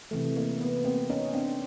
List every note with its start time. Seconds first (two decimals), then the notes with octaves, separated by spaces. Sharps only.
0.11 C3 E3 A3
0.36 A#3
0.61 B3
0.84 A#3 C4
1.09 C#4 D#4
1.33 C4 D4